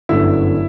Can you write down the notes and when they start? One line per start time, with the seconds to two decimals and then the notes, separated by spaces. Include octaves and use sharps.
0.09 G1 F#2 D3 E4 E5